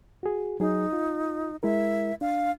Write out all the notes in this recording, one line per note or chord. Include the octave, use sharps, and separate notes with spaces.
F#4 G#4
F#3 D#4 G#4
F4
G#3 E4 A#4 E5
D4 F5